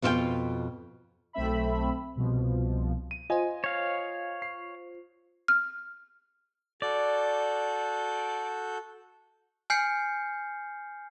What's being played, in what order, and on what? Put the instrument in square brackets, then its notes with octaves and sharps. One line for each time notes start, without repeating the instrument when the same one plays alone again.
[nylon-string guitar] F2 B2 F4 F#4 F5 G5
[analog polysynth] B1 A3 C4 E5 B5
C2 B2 F3
[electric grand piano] D#7
[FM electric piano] F4 C5 [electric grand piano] D#5 G#5
[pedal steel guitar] C#5 F5
[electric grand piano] C7
[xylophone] F6
[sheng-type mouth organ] F#4 A4 G6 [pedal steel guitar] D5
[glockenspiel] G#5 F6 G6 C7 C#7